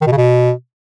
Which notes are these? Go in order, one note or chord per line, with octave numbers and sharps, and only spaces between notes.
D#3
B2
C#3
B2